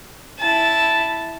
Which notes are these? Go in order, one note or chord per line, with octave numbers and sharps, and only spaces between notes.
E4 A5